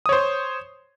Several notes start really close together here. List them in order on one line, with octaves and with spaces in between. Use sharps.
D#6 C#5 C5